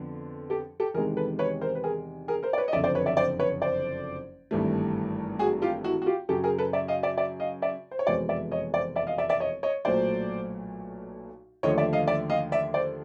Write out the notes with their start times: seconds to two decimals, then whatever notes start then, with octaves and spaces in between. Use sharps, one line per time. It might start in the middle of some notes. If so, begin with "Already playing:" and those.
Already playing: F2 D3 F3 B3
0.50 G4 A4
0.80 G4 A4
0.94 E2 C3 D#3 G#3 G#4 A#4
1.17 A4 B4
1.39 B4 C#5
1.61 A#4 C5
1.75 B4
1.84 G#4 A#4
2.28 G#4 A#4
2.43 A#4 C5
2.53 D5
2.58 B4 C#5
2.68 D#5
2.73 F#1 F2 D3 D5 E5
2.84 C5 D5
2.95 B4 C#5
3.06 D5 E5
3.17 C5 D5
3.40 B4 C#5
3.62 C5 D5
4.51 G#1 G2 E3 A3
5.39 F#4 G#4
5.62 F4 G4
5.84 E4 F#4
6.02 F#4
6.06 F4 G4
6.29 F#2 C#3 F#3 G4 A4
6.44 G#4 A#4
6.58 A4 B4
6.73 D5 E5
6.88 D#5 F5
7.03 D5 E5
7.18 D5 E5
7.40 D#5 F5
7.62 D5 E5
7.91 C5
7.99 C#5
8.07 F1 E2 B2 G#3 B3 C5 D5
8.29 D5 E5
8.51 C#5 D#5
8.74 C5 D5
8.96 D5 E5
9.07 D#5 F5
9.18 D5 E5
9.29 D5 E5
9.40 C#5 D#5
9.63 C#5 D#5
9.85 B1 A#2 F#3 A3 C5 D5
11.63 D#2 D3 F3 A3 C#5 D#5
11.78 D5 E5
11.93 D#5 F5
12.08 D5 E5
12.30 D#5 F5
12.52 D5 E5
12.74 C5 D5